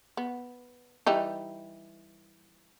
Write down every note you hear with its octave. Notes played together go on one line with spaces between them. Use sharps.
B3
E3 G3 D#4